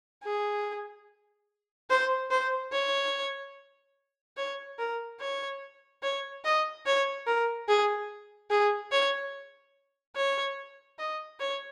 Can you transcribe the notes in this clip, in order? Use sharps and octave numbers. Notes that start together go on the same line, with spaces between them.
G#4
C5
C5
C#5
C#5
A#4
C#5
C#5
D#5
C#5
A#4
G#4
G#4
C#5
C#5
D#5
C#5